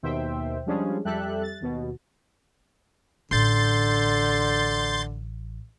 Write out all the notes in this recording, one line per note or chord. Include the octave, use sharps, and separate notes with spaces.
D#2 B2 D#3 C5 E5 G5
F3 G3 G#3 C#4 D4 G#4
F2 G3 G4 A4 E5 F#6
A6
D#2 B2
A1 D3 C6 G6 A6